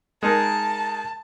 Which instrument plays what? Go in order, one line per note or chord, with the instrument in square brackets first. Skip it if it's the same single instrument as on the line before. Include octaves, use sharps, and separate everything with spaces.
[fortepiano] G#3 D#4 A#4 [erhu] A5